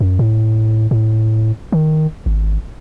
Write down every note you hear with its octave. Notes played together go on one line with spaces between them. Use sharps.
F#2
A2
A2
D#3
G#1